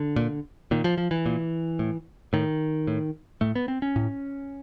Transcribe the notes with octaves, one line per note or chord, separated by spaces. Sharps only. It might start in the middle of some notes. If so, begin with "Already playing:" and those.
Already playing: D3
A#2
A#2 D#3
F3
F3
E3
A#2
A2
A2 D#3
A2
A2 A3
B3
C4
C#4
A2